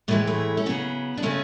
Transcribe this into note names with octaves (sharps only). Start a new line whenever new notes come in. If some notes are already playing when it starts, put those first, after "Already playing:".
A2 E3 G#3 A3
A3
C#4
C#3 F#3 B3
D4
C#3 G#3 A3 C#4